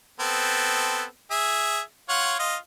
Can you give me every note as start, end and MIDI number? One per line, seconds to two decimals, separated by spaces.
0.20 1.04 59
0.20 1.04 60
0.20 1.04 69
1.31 1.80 68
1.31 1.80 76
2.09 2.35 65
2.09 2.35 73
2.09 2.35 78
2.39 2.56 65
2.39 2.56 75